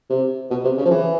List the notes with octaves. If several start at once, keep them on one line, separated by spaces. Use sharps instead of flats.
C3
B2
C3
C#3
F3
E3